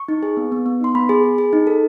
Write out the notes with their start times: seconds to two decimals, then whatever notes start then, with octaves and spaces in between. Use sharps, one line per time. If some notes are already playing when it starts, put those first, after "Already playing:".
Already playing: C#6
0.08 D#4
0.23 G#4
0.37 B3
0.52 B3
0.66 B3
0.81 D#4 C6
0.95 B3 B5
1.09 G#4
1.23 G#4
1.38 G#4
1.53 D#4
1.67 A4